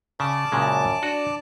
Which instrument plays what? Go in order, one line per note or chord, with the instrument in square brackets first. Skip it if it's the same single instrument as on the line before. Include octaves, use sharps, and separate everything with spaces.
[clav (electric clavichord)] C#3 [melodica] D5 A5 D6
[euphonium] F#2 [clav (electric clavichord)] A#2 C#3 G#3
[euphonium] D4 [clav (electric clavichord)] F#4